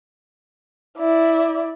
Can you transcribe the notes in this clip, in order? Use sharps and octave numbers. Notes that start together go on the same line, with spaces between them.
E4 D5